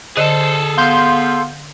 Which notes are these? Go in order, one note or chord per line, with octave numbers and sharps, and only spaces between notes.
D3 G#4 A4 C5 D#5 A5
B3 F5 C6 G6